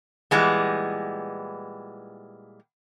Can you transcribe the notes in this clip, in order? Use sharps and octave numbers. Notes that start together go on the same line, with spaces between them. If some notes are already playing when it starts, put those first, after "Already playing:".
A#2 E3 G3 G#3 B3